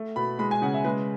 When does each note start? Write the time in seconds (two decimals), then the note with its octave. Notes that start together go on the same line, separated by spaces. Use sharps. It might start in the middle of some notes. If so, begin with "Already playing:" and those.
Already playing: A3
0.16 B2 B5
0.39 G#3 B5
0.51 G#5
0.62 C#3 F#5
0.74 E5
0.84 G#3 B4